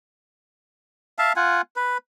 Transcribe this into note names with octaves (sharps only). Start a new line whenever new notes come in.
E5 F5 A5
F4 F#5 G#5
B4